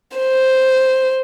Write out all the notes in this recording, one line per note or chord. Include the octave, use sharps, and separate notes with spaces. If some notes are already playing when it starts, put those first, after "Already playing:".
C5